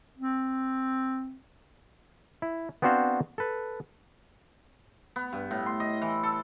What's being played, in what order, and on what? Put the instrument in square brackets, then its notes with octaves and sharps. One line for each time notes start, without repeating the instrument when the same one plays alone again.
[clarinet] C4
[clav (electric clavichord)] E4
B3 C4 D4 F#4 C5 F5
A4 B4
[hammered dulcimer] B3
G2
A2
C6
D#5
E3
A4